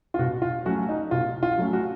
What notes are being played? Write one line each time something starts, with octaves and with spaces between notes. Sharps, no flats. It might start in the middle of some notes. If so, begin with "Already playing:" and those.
F4
B2 F#4
F4
F#3 A3 C#4 F#4
D#4
B2 F4
F4
F#3 A3 C#4
F#4